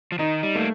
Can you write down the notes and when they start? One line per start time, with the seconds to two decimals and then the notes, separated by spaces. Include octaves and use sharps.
0.12 F3
0.19 D#3 D#4
0.43 G3
0.55 A3 A#3